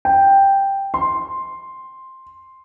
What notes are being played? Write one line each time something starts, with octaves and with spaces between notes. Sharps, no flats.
G5
C6